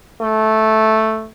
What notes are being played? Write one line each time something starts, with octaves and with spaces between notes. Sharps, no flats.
A3